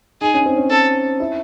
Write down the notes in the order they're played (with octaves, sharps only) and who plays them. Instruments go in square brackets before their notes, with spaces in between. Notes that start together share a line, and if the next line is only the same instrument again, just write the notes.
[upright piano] D#4 [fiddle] G#4
[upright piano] C#4
C4
C#4
[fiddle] A4
[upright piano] E4